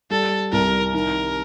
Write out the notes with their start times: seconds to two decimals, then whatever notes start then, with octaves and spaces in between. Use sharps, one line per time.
0.10 G3 A4
0.52 C2 A#4
0.94 D#3 A#4